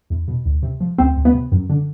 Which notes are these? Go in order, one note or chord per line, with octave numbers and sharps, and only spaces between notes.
E2
B2
D2
C3
F3
D2 C4
D2
B3
C3
F#2
D3